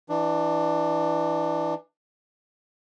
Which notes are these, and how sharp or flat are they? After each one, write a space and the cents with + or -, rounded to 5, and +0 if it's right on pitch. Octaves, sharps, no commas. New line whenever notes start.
E3 +0 D4 +20